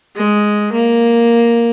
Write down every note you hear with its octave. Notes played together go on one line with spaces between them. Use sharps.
G#3
A#3